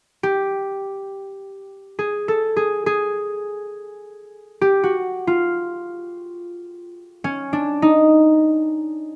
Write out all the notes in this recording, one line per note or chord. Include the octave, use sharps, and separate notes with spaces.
G4
G#4
A4
G#4
G#4
G4
F#4
F4
C#4
D4
D#4